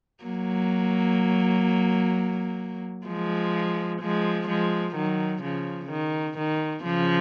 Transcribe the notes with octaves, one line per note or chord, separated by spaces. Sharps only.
F#3 A#3
F3 G#3
F3 G#3
F3 G#3
D#3 F#3
C#3 F3
D#3
D#3
C#3 F3